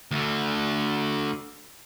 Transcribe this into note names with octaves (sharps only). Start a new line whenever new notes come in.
D2 D3